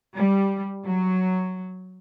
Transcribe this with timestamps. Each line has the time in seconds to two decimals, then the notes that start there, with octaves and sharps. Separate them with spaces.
0.16 G3
0.83 F#3